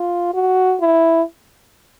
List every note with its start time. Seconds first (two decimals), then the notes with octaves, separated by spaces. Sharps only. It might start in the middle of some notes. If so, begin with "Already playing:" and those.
Already playing: F4
0.34 F#4
0.81 E4